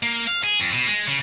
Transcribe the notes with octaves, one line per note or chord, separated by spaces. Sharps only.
A#3
F5
G#4
F2
B2
G#3
C#3